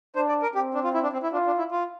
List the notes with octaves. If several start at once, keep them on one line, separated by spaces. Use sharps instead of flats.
D4 C5
D5
A#4
C4 G4
D4
F4
E4
D4
C4
E4
D4 F4
D4
E4
F4